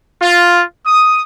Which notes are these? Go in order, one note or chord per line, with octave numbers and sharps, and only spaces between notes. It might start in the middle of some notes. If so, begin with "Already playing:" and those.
F4
D#6